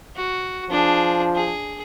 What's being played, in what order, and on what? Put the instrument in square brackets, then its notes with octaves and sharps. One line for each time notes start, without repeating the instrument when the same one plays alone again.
[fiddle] F#4
[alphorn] F3 [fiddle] D4 G#4
[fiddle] G#4